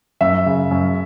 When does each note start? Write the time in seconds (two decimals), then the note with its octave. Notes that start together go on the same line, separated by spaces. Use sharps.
0.21 F#2 E5
0.46 C#3
0.71 F#2